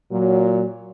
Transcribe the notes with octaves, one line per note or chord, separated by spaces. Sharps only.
A#2 F#3